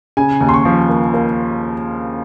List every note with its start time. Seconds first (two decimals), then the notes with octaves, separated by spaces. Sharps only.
0.17 C#3 G#5
0.41 D#2
0.49 C6
0.54 C#6
0.65 F3
0.89 A#3
1.14 A#3